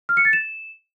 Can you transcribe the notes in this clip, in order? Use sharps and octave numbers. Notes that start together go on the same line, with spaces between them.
F6
C#7
A6
E7